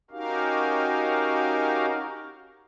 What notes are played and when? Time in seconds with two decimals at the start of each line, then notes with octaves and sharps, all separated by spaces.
0.11 C#4 D#4 F#4 G4 A#4 F5